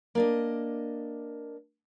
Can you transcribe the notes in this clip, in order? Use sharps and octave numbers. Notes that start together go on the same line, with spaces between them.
A#3 D4 D#5